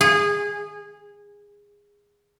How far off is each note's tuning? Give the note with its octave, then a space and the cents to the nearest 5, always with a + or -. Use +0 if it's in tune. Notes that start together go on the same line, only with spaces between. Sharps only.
G#4 -20